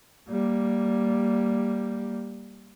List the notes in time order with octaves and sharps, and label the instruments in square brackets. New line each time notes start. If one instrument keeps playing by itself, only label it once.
[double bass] G3 A#3